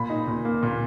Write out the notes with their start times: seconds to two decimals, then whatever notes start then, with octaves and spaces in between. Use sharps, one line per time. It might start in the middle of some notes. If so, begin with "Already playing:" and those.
Already playing: A#2 B5
0.10 D#4
0.27 A#2
0.45 A#3
0.63 A#2